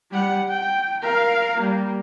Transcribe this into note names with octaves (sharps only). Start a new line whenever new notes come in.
G3 F#5
G5
A#4 F5
G3 A#3